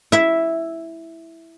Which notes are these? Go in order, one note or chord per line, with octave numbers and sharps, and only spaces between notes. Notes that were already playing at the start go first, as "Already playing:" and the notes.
E4 E5